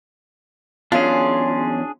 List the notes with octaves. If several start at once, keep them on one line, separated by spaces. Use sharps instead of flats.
E2 F#3 C#4 D4 F4 G#4